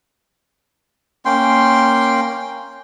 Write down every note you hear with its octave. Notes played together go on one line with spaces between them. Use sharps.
A#3 C#4 G5 C6